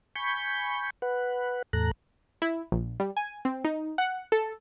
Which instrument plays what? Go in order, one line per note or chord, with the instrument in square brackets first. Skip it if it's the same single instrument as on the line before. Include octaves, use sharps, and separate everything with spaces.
[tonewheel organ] G#5 B5 C#6 G6
B4 F#5
E2 A2 A4 A#5 F#6
[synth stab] E4
A#1
G3
G#5
C4
D#4
F#5
A4